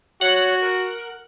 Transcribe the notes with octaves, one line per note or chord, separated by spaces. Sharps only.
F#4 C#5 F#5 F#6
A#4